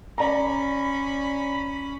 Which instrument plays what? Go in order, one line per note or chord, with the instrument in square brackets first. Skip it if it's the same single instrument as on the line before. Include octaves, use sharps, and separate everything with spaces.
[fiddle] C#4 B5 [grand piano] D5 A#5